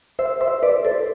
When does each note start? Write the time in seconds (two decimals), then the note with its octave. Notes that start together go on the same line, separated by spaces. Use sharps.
0.19 C5 E5
0.41 C5 E5
0.63 B4 D5
0.85 A4 C5